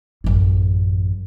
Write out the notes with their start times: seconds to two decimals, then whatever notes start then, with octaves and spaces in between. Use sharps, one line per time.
0.24 A1 F#2